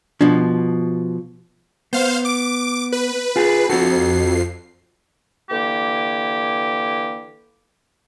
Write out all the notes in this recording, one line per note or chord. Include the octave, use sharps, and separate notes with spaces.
B2 F3 D4
B3 C5 F5
D6
B4
F4 G#4
F2 F#4 A4 C7
D3 E3 A#3 G4